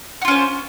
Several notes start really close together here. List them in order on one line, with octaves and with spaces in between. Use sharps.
F#4 F4 C#4 C5